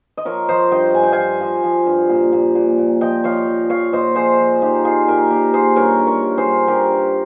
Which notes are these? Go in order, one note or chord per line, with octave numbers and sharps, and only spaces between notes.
D#5
F3 A#4 C#5
F3 C5 D#5
G2 D#5 G5
G2 G#5
G5
F5 G#5
F3
F3
F3
G2
A#2
A#2
A#2
A#2
F3 D#5 G5
F3 C#5 F5
F3
F3 C#5 F5
A#2 C5 D#5
F3 G#4 C5
F3
F3 D#4 G4
F3 F4 G#4
A#2 G4 A#4
A#2 G4 A#4
A#2 G#4 C5
G2 A#4 C#5
G2
A#4 C#5
G2
G#4 C5
G2
G2 G4 A#4
G2